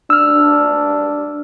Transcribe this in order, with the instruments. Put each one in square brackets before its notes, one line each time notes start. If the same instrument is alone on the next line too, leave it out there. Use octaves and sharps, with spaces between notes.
[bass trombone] D4 [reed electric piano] E6 F6